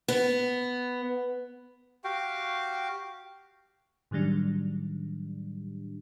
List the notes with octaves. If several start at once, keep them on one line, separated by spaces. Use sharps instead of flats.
B3
F#4 G4 F5 G5
A2 D#3 F#3 G3 D4